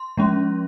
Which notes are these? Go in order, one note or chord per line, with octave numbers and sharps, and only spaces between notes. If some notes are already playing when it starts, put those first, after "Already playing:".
Already playing: C6
F3 G#3 C#4